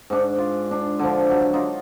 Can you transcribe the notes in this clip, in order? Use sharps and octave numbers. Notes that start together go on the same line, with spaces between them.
G#2 D4
F4
D4
D3 F3
F#3
D#4 F4